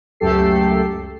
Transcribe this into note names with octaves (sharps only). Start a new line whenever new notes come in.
C#2 F#2 A3 G4 A4 C7